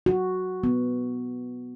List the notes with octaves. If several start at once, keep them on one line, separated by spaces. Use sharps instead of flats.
F#4
B3